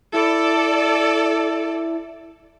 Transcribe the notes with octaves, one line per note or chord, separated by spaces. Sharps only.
E4 A4 D5